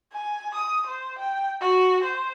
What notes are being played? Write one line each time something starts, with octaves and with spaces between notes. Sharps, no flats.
G#5
D#6
C5
G5
F#4
C5